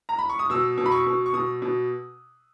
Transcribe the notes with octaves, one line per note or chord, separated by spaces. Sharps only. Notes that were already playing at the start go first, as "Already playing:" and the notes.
A#5
B5
C#6
D#6
B2 E6
B2
B5
C#6
B2
C#6
B2 D#6
B2